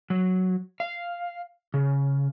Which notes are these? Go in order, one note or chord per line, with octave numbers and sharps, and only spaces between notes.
F#3
F5
C#3